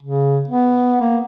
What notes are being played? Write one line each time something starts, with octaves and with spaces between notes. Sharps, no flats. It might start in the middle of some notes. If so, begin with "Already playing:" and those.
C#3
B3
A#3